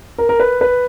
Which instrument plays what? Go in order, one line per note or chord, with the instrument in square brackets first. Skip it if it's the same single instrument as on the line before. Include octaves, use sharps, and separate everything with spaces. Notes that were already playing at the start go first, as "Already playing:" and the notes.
[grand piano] A#4
A#4
B4
B4